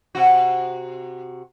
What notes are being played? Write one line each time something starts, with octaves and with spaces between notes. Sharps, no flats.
C3 F#4